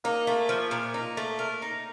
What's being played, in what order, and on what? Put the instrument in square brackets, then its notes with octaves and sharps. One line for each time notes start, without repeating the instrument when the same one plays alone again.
[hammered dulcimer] A#3 [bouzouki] D#4
[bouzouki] A3
F3
A#2
D#4
A3
A#4
D#4